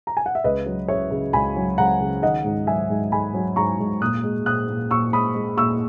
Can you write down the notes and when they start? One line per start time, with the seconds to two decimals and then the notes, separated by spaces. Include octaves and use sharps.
0.07 A#5
0.17 G#5
0.26 F#5
0.35 E5
0.44 C#2 B4 D#5
0.66 F#3
0.88 C#3 C#5 E5
1.11 C#3
1.33 C#2 G#5 B5
1.56 F#3
1.78 C#2 F#5 A#5
2.00 C#3
2.23 D#3 D#5 F#5
2.45 G#2
2.67 F#3 E5 G#5
2.90 G#2
3.12 G#2 G#5 B5
3.34 F#3
3.56 G#2 A#5 C#6
3.79 G#2
4.01 A#2 D#6 F#6
4.23 G#3
4.46 A#2 D#6 F#6
4.68 A#2
4.91 A#2 C#6 E6
5.13 G#3 B5 D#6
5.35 G#3
5.57 A#2 C#6 E6